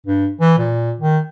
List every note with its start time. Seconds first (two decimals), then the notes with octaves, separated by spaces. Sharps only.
0.06 G2
0.41 E3
0.58 A#2
1.00 D#3